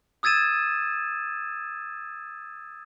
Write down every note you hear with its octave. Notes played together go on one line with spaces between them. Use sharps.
D#6 E6 G#6 A6 D#7 E7